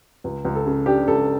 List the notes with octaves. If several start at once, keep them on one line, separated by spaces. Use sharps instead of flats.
C#2
C#2
A4
C#3
D4 G4
C#2 A4